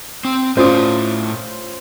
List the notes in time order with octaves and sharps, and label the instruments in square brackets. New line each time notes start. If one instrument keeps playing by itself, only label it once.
[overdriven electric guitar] C4
[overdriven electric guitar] A2 D5 [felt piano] C#4 F4 D#6 [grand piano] C5